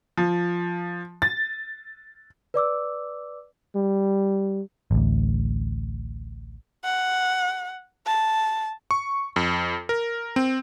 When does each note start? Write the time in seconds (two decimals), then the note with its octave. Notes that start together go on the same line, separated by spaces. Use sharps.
0.17 F3
1.22 A6
2.54 B4 D5 D6 E6
3.75 G3
4.91 A1 D2
6.84 F#5
8.06 A5
8.91 C#6
9.36 F2
9.89 A#4
10.36 C4